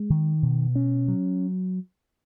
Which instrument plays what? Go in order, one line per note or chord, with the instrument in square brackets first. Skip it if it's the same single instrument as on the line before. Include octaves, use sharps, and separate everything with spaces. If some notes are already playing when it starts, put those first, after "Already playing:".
Already playing: [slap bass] G#3
D#3
B2
C#4
F#3